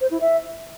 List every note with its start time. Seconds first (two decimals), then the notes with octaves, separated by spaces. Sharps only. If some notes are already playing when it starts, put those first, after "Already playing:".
0.01 C5
0.11 E4
0.21 E5